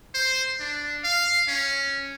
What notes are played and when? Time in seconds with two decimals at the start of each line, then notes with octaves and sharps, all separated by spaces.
0.14 C5
0.60 D4
1.04 F5
1.48 C#4